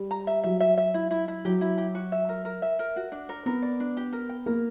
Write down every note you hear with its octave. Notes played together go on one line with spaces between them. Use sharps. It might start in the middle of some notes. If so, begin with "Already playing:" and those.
Already playing: G3
A#5
E5
F#3 E5
E5
E5
E4
E4
E4
F#3 G4
E4
G4
F#4
E5
A#4
A#4
E5
A#4
F#4
D4
A#4
B3 A#4
D5
D4
G4
A#4
G5
A#3 A#4